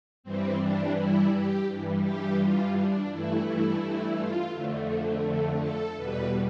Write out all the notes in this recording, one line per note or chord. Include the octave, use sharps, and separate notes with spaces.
G2 E3 G3 C4
D4
E4
G4
G2 E3 G3
G4
F4
D4
G2 E3 A3 E4
E4
E4
F4
F2 D3 A3
A4
E2 B2 G3 B4